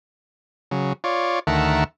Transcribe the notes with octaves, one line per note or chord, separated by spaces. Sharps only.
C#3 F#3
F4 C#5 D5
D2 D#3 A#4 E5 F#5 A5